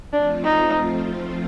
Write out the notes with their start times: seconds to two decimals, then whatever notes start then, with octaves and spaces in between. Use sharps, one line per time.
0.13 F3 A3 C4 D4 F4
0.44 D#4